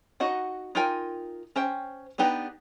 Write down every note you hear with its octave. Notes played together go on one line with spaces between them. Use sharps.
D#4 F#4 D#5 F#5
D#4 F4 A#4 G5 G#5
C#4 C5 G5
B3 D4 D#4 G4 B4